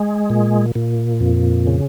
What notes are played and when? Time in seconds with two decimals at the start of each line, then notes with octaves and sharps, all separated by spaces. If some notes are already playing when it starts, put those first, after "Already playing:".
Already playing: G#3
0.30 A#2
0.75 A#2
1.20 F2
1.67 C#3